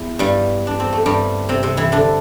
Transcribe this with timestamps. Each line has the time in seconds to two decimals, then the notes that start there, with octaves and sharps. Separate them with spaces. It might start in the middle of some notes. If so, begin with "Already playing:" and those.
Already playing: E2 E3
0.19 G2 G3
0.67 D4
0.80 C4
0.93 A3
1.06 G2 G3
1.49 C3 C4
1.63 C3 C4
1.77 E3 E4
1.92 D3 D4